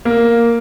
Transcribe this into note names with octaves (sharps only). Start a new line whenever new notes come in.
A#3